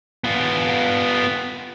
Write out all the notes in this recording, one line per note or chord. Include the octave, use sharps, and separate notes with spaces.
B3 F4